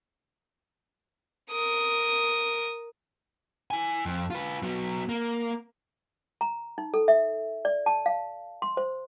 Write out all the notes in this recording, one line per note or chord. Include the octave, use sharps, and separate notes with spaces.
A#4 D#6
E4 G#5
F2
F4 B4
F#3 B3
A#3
A#5
D#4
A4
E5
D5
A5
F5
C6
C5